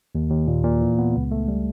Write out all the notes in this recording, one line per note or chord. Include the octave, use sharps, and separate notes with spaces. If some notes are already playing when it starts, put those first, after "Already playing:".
D#2
D#2
A#2
A#2
E3
B3
C#2
A3
G3